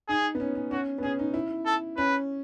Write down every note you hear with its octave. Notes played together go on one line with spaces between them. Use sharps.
D#4 G#4
B3
C#4
C#4
C#4 F#4
B3
C#4 G#4
D#4
E4
A4
C#4 B4